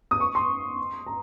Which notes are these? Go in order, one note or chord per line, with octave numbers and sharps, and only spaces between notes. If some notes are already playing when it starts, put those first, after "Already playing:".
D#6
C#6
C6
A#5